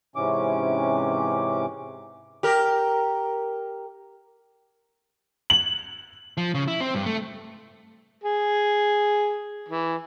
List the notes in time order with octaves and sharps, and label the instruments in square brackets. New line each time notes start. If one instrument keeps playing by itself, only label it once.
[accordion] G#2 C3 E3 C#4 D6
[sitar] G4 A#4
[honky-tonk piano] F#7
[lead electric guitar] F3
C#3
E4
C4
G2
A3
[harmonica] G#4
E3